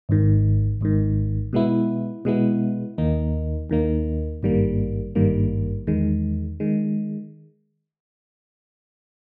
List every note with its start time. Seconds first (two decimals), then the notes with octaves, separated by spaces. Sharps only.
0.09 G#1 G#2 D#3
0.81 G#1 G#2 D#3
1.53 B2 G#3 B3 E4
2.25 B2 G#3 B3 E4
2.98 D#2 D#3 A#3 D#4
3.70 D#2 D#3 A#3 D#4
4.43 G#1 G2 D#3 G3 A#3
5.15 G#1 G2 D#3 G3 A#3
5.87 E2 D#3 G#3
6.60 D#3 G#3